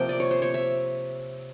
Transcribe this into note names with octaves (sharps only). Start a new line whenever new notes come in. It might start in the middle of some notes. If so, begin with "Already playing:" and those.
Already playing: C3 F3 A#3 G5
D5
C#5
C5
C#5
E5